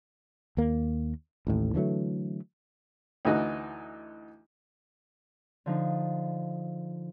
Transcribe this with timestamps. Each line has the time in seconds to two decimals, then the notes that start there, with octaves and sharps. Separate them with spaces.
0.57 D#2 A#3
1.47 A1 D#2 A2
1.75 D3 E3 F#3 A3
3.25 D2 E3 D#4 F#4
5.66 D3 F3 D#4